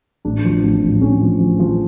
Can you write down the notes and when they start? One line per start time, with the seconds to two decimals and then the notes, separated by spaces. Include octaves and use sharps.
0.25 A1 D4
0.45 F3
0.64 A1
0.82 A1
1.01 A1 C#4
1.21 F3
1.39 F3
1.59 F3